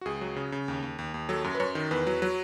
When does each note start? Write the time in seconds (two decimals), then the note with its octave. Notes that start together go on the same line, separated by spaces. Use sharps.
0.01 F#4
0.05 C#2 G#4
0.21 F#3
0.36 C#3
0.52 C#3
0.68 D#2
0.83 D#2
0.99 D#2
1.14 D#2
1.29 F#3 A4
1.44 F#2
1.55 B4
1.60 F#2 C#5
1.75 D#3
1.91 E2 B4
2.07 F#3
2.22 F#3